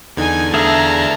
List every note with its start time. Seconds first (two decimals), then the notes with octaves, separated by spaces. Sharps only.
0.17 E2 D3 D#4 G#5 G#6
0.54 A3 D4 G#4 E5 F5 A5 A#5